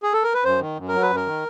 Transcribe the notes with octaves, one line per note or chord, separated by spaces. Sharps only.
G#4
A4
A#4
B4
F#2 C5
D#3
F#2
A#4
F#3
B4
F#2
A#4
D#3